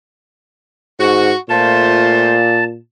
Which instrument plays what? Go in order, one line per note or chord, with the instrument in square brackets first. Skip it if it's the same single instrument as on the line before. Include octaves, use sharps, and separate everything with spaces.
[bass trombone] G#2 [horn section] F#4
[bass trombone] A#2 [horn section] A3 F4 C5 [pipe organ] A5